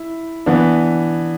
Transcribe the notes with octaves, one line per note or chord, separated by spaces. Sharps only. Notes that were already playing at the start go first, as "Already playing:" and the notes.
Already playing: E4
E3 B3 D4